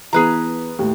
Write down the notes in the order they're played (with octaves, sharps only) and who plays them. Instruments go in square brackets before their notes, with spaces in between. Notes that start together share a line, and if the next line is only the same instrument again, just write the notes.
[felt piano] E3 B3 [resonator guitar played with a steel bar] G#4 B4 A#5
[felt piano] D#2 A2